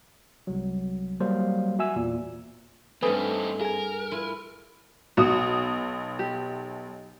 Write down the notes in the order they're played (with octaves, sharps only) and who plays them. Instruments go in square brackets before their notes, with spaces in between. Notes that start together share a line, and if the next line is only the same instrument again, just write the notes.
[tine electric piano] C2 F#3
F#3 G3 A#3 C5 F5
F#4 E5 G#5 E6
E2 A#2
[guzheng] G2 A3 [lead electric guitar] C4 D#4 [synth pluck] B4 G#5 D#6
[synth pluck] G#4 G#5 [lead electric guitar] A#4
[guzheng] E4 F4
[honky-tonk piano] B1 D#6 [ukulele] F#4
[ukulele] G4